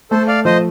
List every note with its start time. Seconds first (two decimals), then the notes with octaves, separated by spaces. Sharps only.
0.11 A3 A4 C5
0.28 D5 F5
0.45 F3 C5 D#5